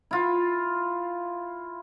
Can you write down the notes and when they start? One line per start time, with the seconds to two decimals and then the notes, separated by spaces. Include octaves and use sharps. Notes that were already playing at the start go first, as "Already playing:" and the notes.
0.11 E4 F4